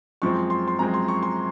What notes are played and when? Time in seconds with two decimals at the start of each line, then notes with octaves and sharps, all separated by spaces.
0.22 F#2 F3 G#3 C4 C#6
0.50 C6
0.68 C6
0.79 F#2 F3 G#3 C4 A#5
0.94 C6
1.08 C#6
1.23 C6